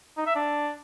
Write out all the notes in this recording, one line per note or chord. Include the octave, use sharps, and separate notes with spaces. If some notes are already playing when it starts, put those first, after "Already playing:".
D#4
E5
D4